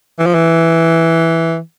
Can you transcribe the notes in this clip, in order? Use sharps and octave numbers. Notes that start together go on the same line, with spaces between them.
E3
F3
E3